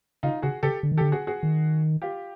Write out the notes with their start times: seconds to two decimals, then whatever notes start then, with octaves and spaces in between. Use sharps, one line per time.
0.23 C#3 D#4 F4
0.42 C#3 F#4 G#4
0.63 C#3 G4 A4
0.83 D3
0.92 D#3
0.97 D3 G4 A4
1.12 F#4 G#4
1.27 F#4 G#4
1.43 D#3
2.02 F4 G4